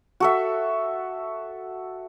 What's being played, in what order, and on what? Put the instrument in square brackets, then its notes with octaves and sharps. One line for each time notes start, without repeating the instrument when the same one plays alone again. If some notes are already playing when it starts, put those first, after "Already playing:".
[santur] F#4 A4 E5